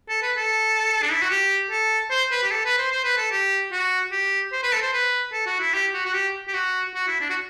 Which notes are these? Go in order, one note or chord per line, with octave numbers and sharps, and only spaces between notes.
A4
B4
A4
D4
E4
F#4
G4
A4
C5
B4
G4
A4
B4
C5
C5
B4
A4
G4
F#4
G4
C5
B4
A4
C5
B4
A4
F#4
E4
G4
F#4
F#4
G4
G4
F#4
F#4
E4
D4
F#4